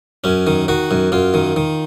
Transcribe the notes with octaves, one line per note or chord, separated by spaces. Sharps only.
F#2 C#4
D#3
D#3 F#4
F#2
F#2 F4
D#3
D#3